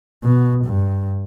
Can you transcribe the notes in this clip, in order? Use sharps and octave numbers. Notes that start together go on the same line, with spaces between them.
B2
G2